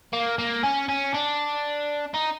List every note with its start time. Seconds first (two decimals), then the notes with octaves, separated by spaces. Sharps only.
0.13 A#3
0.38 A#3
0.63 C#4
0.89 C#4
1.15 D4
2.14 D#4